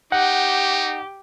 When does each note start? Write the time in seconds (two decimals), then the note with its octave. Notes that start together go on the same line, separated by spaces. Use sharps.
0.12 D#4 G4 F#5